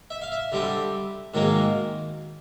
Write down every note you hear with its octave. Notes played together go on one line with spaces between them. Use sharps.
E5
F5
E5
D3 G3 C4
G#2 D#3 F#3 A#3